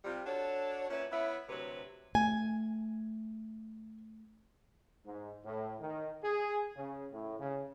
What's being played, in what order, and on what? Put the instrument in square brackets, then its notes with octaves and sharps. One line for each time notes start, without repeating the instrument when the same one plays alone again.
[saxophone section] C3 G3 C4 F4
D4 F#4 A4 C#5
A#2 C#4 E4 B4 C#5
B3 E4 B4 C#5 E5
D2 C3 F#3 B4
[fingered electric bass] A3 [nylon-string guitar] G#5
[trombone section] G#2
A2
D#3
G#4
C#3
A2
C#3